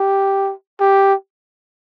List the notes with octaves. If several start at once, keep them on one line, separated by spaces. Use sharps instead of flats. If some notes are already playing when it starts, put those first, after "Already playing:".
Already playing: G4
G4